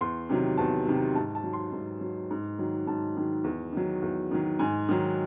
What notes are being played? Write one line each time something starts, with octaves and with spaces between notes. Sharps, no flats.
E2 C6
C3 D#3 F#3
E2 A5
C3 D#3 F#3
G#2 A5
A5
F#3
C6
G#2
F#3
G#2
D#3 F#3
G#2 A5
D#3 F#3
E2
D#3 F#3
E2
D#3 F#3
G#2 G#5
D#3 F#3